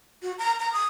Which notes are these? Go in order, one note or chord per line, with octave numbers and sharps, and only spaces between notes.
F#4
A#5
A#5
D#6